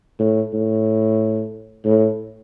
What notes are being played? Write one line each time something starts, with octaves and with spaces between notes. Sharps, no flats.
A2
A2
A2